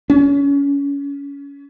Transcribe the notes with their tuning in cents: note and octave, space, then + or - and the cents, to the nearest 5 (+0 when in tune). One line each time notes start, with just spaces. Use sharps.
C#4 +25